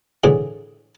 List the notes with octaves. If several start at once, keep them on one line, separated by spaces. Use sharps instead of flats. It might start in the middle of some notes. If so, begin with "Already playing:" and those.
A2 D3 E3 G#4